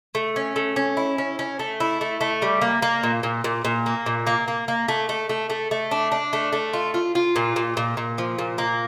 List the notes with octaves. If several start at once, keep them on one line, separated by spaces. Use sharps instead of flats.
A3
C#4
A3
C#4
E4
C#4
C#4
A3
E4
A3
A3
G3
A#3
A#3
A#2
A#2
A#2
A#2
A#3
A#2
A#3
A#3
A#3
A3
A3
A3
A3
A3
D4
D4
A3
A3
F4
F4
F4
A#2
A#2
A#2
A#2
F3
A#2
A#3